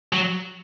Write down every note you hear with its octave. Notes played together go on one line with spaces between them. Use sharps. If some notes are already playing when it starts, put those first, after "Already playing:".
F#3